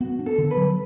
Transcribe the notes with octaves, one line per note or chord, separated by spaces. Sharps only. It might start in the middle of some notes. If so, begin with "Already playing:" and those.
B3 F#4
D4
A4
D3
B4
F#3